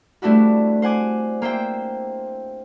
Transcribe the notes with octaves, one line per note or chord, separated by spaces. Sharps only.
G2 A3 C4 D4 E4 F#4
C5 F#5 G#5 D6
A#3 C5 E5 G5